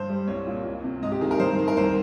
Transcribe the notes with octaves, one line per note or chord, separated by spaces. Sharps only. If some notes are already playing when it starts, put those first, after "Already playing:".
Already playing: G2 C5
G3
C2 C#5
A#2
C#2
C3
G#2 D#5
G4
D#3 G#4
A#4
G2 C5
D#3
A#4
C2 C5